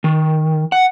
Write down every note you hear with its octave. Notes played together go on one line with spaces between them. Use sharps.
D#3
F#5